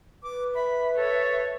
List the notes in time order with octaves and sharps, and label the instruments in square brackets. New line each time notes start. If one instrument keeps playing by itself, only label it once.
[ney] B4 [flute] D6
[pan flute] E5 [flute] B5
[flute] A4 [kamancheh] C#5